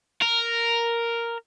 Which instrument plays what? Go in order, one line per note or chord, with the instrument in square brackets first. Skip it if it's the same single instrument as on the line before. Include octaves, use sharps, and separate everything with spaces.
[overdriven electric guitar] A#4